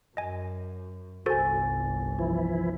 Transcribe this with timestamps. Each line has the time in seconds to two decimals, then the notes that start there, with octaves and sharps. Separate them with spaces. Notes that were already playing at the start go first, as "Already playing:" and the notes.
0.17 F#2 D#5 G#5
1.26 G1 C2 F#4 A4 C5 G#5 A6
2.19 E3 F3 E4